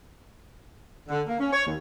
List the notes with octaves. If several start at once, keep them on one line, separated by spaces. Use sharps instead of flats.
D3
A#3
C#4
C#5
D#2